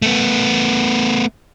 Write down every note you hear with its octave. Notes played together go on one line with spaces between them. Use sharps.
A3 B3